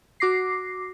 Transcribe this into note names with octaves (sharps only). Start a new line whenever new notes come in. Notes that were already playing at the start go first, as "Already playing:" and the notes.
F#4 D6 A#6 C7